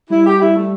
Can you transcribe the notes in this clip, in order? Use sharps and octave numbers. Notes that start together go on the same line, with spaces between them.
G3 E4
G4
E4
A3